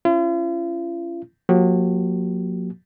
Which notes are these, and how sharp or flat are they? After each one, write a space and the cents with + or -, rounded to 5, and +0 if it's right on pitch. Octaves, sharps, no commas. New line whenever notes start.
C#4 +0 F4 -45
F#3 -40 A#3 +5 G4 -35